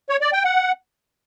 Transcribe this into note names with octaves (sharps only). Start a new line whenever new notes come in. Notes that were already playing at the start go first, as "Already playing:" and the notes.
C#5
D5
G5
F#5